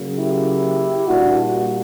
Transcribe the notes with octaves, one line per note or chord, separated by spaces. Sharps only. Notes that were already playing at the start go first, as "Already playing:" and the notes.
Already playing: C#3 F#3 A#3
E4 G4
A#2 G3 A#3 D4 F#4